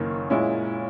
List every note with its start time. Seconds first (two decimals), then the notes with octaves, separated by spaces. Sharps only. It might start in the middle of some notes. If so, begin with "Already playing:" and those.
Already playing: F#1 F#2 D#3 A#3 C#4
0.30 A#2 G#3 C#4 E4